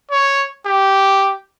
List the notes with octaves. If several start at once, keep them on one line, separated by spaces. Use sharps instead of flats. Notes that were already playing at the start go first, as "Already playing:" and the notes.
C#5
G4